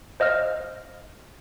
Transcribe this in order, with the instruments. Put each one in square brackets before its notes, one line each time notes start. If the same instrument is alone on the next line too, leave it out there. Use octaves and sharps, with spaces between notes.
[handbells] C5 D#5 F5 F6